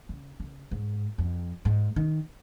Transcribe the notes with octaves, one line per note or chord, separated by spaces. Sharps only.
C#3
C#3
G#2
F2
G#2
D#3